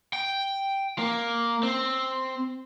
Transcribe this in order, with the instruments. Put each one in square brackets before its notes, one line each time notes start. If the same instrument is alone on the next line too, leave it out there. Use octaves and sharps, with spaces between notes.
[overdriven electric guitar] G5
A#3
C4